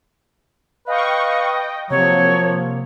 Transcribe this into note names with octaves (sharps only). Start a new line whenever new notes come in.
B4 D#5 F5 G5 C#6
G5
C3 F3 F#3 A#3 C#5